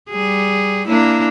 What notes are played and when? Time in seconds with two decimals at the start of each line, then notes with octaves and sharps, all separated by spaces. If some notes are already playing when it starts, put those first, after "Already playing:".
0.10 G3 G#4
0.87 A#3 D4 E4